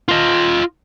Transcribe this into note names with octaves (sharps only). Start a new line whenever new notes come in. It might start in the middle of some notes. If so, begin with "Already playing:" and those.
F4 D#5